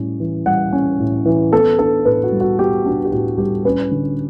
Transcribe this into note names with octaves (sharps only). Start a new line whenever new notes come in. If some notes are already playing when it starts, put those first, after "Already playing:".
Already playing: A2 G3 C#4
E3
G3 F#5
C#4
A2
E3
B3 A4
D4 A4
A2 B4
F#4
G3
F#4
B3 G4
D4 F#4
G4
A2 F#4
G3 G4
C#4 B4
D3